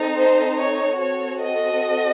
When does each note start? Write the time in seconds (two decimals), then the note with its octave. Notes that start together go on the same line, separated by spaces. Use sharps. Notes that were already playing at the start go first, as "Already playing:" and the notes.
Already playing: C4 D#4 A4
0.16 C5
0.58 C#5
0.99 C4 F#4 A4 C#5
1.40 D#5